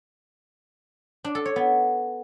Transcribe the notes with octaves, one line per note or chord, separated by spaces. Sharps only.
D4
A4
C#5
B3